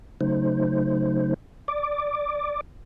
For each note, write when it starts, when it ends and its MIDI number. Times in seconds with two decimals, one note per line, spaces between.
0.21 1.34 49
0.21 1.34 54
0.21 1.34 57
0.21 1.34 63
0.21 1.34 72
1.68 2.61 74
1.68 2.61 86